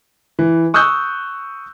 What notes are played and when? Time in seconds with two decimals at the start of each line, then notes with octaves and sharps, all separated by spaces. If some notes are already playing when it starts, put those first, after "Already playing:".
0.39 E3
0.74 C#6 D#6 E6 F#6 G6